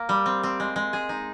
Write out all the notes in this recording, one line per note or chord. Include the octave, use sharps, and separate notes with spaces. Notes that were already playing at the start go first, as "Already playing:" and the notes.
Already playing: A#3
G3
C4
C4
G#3
G#3
G#4
D#4